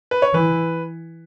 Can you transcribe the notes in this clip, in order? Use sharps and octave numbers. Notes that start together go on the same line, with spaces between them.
B4
C#5
E3 B4